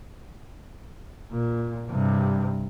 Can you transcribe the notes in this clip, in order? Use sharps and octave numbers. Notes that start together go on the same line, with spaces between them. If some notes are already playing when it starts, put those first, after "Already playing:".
A#2
G2 C3